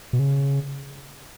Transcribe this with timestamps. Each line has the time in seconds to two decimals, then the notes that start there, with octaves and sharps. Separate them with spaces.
0.13 B2
0.19 C#3